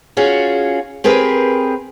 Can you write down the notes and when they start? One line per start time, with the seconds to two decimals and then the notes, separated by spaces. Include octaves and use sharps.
0.17 C#4 F4 F#4 G#4
1.04 C4 G4 G#4 A#4 B4